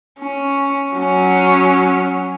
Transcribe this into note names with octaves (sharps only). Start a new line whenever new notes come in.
C#4
F#3 C#4